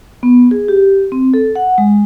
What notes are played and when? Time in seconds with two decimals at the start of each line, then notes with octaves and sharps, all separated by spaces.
0.23 B3
0.51 G#4
0.68 G4
1.12 C4
1.34 A4
1.55 F#5
1.78 G#3